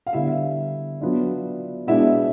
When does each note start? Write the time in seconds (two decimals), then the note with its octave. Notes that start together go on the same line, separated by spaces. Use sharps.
0.07 F5
0.13 D3 G3 B3 E4 E5
1.01 F#3 B3 D4 F4
1.87 B2 G#3 B3 D4 E4 E5